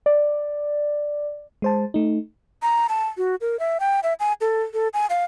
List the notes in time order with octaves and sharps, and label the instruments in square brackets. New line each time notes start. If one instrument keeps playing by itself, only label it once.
[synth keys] D5
[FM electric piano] G#3 C5 A5
A3 D#4
[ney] A#5
A5
F#4
A#4
E5
G5
E5
G#5
A4
A4
G#5
F5